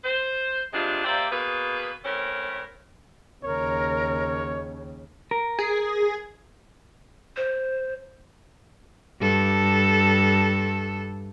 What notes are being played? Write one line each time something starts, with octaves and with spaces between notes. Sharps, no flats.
C5
G2 C3 G#3 D4 F4
A#3 G4 C5 D5 E5
B2 A#3 G#4 B4
A2 C4 C#4 A#4
D#2 C#3 A#4 C#5
A#4
G#4
C5
G2 A4